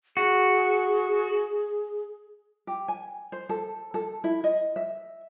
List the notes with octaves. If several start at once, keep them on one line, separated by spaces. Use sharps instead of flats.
F#4 G#4
G4
G#5
C5
A4
A4
E4
D#5
E5